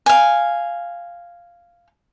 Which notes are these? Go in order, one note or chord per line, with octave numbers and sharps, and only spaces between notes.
F5 G#5